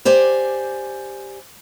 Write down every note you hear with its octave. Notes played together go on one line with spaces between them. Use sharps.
G4 C5 D5 G#5